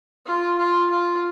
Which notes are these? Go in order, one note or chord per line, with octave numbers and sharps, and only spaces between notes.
F4
F4
F4